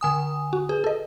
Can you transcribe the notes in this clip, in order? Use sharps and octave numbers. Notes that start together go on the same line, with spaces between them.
D3 G#5 D#6
F#4
G#4 B4
A4 D#5